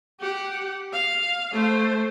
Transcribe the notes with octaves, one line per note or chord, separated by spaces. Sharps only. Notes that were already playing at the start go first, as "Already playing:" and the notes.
G4 F#5
F5
A3 C5